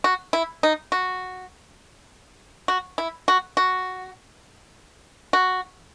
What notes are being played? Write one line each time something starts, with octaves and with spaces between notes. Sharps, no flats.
F#4
E4
D#4
F#4
F#4
E4
F#4
F#4
F#4